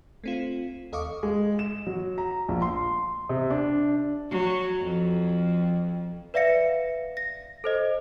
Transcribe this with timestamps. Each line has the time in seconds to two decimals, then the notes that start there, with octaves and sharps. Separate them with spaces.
0.24 A3 C4 F4
0.92 D#2 A4 D#5 F5 C#6 D6
1.23 G#3
1.59 E7
1.87 F#3
2.18 A#5
2.48 A#1
2.62 C6
3.29 C3
3.50 D4
4.30 F#3
4.82 F2
6.34 B4 D5 E5 F5 A#6 C#7
7.17 A#6
7.64 A4 C5 D#5